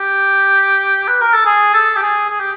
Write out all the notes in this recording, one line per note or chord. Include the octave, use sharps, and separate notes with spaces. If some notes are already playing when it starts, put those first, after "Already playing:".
Already playing: G4
B4
A#4
A4
G#4
A4
G4
G#4
G#4
G4